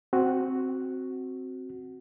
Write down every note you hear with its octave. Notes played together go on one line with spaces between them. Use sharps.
C4 F#4